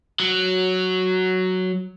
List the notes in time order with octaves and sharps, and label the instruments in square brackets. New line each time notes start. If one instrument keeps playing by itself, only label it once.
[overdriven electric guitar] F#3